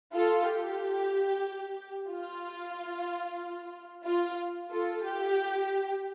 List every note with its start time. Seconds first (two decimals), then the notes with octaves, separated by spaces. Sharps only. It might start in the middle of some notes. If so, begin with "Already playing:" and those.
0.14 F4 A4
0.47 G4
2.10 F4
4.05 F4
4.71 F4 A4
5.04 G4